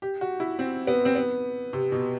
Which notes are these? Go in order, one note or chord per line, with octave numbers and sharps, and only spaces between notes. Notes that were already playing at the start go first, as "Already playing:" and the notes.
G4
F#4
E4
C4
B3
C4
B3
C3
B2